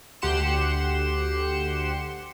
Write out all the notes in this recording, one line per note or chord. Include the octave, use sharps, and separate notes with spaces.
D2 G4 F#5 C6 C#7 E7